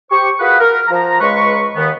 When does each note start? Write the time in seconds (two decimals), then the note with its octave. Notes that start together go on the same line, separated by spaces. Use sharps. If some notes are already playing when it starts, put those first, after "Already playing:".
0.10 G4 C5 C#6
0.40 F4 F#4 G#4 A#4 B4
0.60 A#4
0.88 F3 A#5
1.20 C#2 G#3 B4 C#6
1.76 D#2 D#3 B3